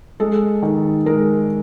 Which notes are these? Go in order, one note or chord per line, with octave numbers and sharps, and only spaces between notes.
G#3 A4
D#3
G#3 A#4